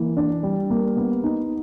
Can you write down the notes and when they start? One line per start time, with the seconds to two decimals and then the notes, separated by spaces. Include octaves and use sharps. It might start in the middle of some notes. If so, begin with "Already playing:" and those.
Already playing: E3 A#3
0.17 D4
0.43 G3
0.70 A#3
0.97 B3
1.24 D#4